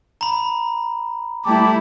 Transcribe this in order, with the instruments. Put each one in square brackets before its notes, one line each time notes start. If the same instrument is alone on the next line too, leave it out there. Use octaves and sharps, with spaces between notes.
[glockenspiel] A#5 B5
[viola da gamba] G3 A3 E4 [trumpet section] G5 A5 D6